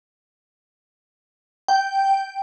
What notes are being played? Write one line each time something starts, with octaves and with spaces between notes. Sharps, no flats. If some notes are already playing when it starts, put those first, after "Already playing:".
G5